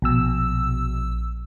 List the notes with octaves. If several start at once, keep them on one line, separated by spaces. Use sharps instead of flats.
A#1 B2 E6